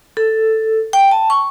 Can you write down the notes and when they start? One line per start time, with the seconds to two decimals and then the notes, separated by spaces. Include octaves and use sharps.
0.17 A4
0.93 G5
1.11 A5
1.30 C#6